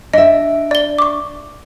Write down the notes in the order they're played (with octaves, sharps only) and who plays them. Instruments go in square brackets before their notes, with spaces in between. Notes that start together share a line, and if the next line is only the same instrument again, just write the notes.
[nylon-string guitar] D4 E5 [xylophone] D#5
[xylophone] D5 G7
C#6 D6